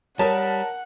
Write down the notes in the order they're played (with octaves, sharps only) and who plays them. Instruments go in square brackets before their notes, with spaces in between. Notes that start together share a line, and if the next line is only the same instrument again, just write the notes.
[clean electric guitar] G3 [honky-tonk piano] A#4 A5 [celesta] C#5 D#6 [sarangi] F#5